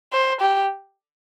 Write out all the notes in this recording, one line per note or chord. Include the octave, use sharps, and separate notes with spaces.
C5
G4